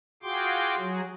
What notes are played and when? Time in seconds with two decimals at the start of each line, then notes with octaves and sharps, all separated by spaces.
0.23 F4 F#4 G#4 G5 C6 D6
0.79 F#3 F#4 G#4